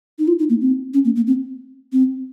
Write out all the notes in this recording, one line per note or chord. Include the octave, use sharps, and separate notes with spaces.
D#4
F4
D#4
A#3
C4
C#4
A#3
A#3
C4
C4